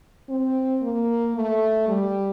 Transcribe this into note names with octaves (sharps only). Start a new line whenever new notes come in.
C4
A#3
A3
G3